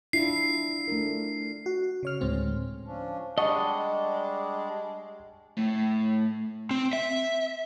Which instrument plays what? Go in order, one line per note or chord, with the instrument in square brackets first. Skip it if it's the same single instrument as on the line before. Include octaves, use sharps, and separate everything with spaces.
[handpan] D4 E4 F4 [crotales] C7
[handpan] A3 D4 A#4
[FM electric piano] F#4
C#3 C#5 F6
D2 A2 G#3 C4
[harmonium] F3 C#4 D4
[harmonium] G3 D4 [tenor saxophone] G#3 [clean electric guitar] D#5 [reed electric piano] F#5 A5 C#6
[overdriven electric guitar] A2
[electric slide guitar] C4
E5